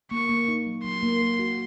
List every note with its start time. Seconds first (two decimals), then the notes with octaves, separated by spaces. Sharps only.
0.11 A#3 C#6
0.29 A#3
0.48 D#4
0.67 F#3
0.84 F#3 C6
1.03 A#3
1.22 A#3
1.39 F#4